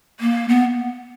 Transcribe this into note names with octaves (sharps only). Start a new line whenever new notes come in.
A#3
B3